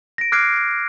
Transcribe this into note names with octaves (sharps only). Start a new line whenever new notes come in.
A#6 D7
D6 F6 F#6 G#6 C7 D7